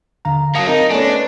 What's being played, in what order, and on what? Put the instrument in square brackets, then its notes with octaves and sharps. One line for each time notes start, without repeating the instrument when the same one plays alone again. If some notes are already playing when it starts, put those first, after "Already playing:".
[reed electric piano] D#2 D3 A#5 [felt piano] F5
[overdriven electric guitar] F#3 A#3 [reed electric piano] F5 A5 D#6 [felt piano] C#7
[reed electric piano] C4 A#4 [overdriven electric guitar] D#4
[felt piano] A3 B3 C#4 [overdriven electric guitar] D4 [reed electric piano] G#5
[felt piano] B4